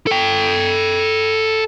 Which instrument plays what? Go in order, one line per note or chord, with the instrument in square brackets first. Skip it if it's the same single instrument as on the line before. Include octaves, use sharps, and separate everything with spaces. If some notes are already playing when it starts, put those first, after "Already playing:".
[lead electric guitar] A4 G5